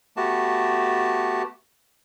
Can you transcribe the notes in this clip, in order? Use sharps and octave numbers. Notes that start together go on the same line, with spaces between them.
A3 B3 F#4 G4 A5